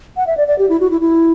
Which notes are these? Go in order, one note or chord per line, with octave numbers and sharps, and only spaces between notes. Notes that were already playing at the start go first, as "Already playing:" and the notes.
F#5
E5
D5
D5
G4
E4
F#4
E4
E4